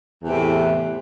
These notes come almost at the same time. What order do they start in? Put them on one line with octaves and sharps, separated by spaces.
E2 C3 A2